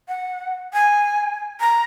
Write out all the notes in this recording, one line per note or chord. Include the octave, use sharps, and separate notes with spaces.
F#5
G#5
A#5